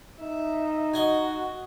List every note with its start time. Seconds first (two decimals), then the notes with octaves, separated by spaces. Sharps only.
0.21 D#4 E5
0.94 F#4 D#5 G#5